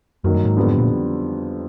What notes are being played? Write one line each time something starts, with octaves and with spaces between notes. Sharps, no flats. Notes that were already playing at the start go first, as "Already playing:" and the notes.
F#2 D#3 F#3 A#3
G2
G#2
F2 D3 G3 B3
A#2